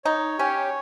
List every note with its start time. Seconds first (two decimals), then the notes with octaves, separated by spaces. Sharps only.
0.05 D#4 C#5
0.38 C#4 G4